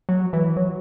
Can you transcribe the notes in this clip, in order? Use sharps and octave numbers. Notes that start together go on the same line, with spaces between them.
F#3
E3
F#3